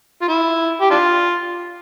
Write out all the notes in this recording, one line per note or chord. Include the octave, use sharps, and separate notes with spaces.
F4
E4
G4
D4 F4